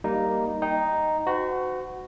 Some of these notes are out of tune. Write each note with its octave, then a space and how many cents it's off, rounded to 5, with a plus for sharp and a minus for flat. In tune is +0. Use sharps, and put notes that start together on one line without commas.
G3 +0 A#3 +0 D#4 +0
D#4 +0 G5 +0
F#4 +0 C5 -45